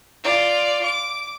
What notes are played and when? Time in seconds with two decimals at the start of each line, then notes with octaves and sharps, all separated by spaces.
0.23 F4 D5
0.83 D6